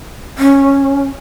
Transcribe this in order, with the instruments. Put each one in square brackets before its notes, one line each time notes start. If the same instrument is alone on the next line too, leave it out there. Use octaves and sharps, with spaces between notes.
[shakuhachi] C#4